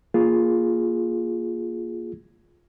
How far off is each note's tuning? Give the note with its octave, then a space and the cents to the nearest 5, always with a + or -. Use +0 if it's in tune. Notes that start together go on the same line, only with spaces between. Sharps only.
A#3 +0 F4 +0 G#4 +0